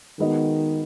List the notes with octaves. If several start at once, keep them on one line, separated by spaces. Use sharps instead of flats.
D#3 G#3 B3 F#4 D#5